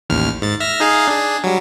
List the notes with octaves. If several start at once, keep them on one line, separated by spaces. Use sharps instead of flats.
A1 D#2 F6
G#2 A6
E5 F6 A#6
D#4 G#4 F5
D4 G#4
F#3 G3